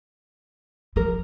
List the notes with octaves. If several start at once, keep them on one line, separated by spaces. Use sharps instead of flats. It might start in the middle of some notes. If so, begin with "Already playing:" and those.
F3 A#4